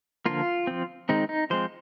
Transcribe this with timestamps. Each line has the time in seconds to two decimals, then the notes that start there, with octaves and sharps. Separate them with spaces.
0.26 D3 F3 A#3 F4
0.67 F3 C4
1.09 D#3 G#3 C4 D#4
1.29 D#4
1.50 F3 G#3 C4 C5